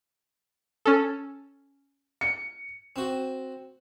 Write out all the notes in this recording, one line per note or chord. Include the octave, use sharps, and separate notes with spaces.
C#4 A4
C#7
C4 F#4